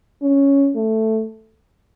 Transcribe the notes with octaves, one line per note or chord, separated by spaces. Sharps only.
C#4
A3